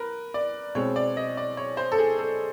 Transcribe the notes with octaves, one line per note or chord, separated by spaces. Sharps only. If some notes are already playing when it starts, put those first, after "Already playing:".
Already playing: A#4 B4
D5
B2 G#3 C4 C#5
D5
D#5
D5
C#5
C5
A4
G#4
A4